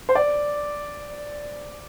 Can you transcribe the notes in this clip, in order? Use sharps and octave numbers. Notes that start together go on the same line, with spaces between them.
C5
D5